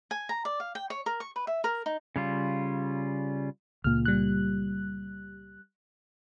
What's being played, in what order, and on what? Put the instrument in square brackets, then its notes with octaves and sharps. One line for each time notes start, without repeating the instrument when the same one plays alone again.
[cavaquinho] G#5
A#5
D5
F5
G5
C#5
A#4
C#6
B4
E5
A#4
D#4
[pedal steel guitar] C#3 G3 F4
[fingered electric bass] C#2 A#2 [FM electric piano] F6
[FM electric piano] G3 F#6